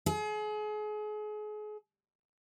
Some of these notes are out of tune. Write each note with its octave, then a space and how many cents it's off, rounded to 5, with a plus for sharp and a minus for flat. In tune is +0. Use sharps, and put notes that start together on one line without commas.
G#4 +35